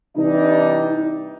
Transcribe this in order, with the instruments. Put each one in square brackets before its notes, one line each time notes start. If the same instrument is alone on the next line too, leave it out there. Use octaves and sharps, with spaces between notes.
[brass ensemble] C3 E3 G3 D4 D#4